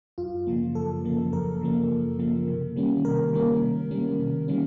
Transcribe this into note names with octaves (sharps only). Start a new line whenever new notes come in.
F#2 F4
C#3 F3 A#3
F#2 A4
C#3 F3 A#3
F#2 A#4
C#3 F3 A#3
F#2
C#3 F3 A#3
C3
D#3 G3 A#3 C#4
C3 A#4
D#3 G3 A#3 C#4
C3
D#3 G3 A#3 C#4
C3
D#3 G3 A#3 C#4